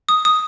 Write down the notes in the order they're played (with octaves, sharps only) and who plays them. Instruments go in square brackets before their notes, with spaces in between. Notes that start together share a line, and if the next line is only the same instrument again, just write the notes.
[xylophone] D#6
D#6